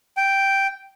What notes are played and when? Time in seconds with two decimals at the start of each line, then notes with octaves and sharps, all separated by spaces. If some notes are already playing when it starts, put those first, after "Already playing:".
0.17 G5